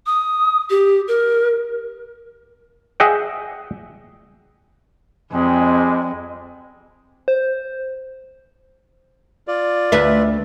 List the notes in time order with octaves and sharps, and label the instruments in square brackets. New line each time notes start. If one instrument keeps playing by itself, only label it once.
[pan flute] D#6
G4
A#4
[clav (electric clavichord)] G#4 D#5 E5 F#5 G5
[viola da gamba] F2 [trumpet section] G3 G#3
[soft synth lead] C5
[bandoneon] F4 D5
[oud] D2 B4 E5